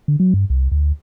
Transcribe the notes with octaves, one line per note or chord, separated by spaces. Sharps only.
D3
F#3
G2
C2
D2